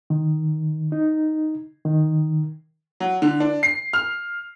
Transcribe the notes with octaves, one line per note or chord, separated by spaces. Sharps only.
D#3
D#4
D#3
F#3
D3
D4
C7
F6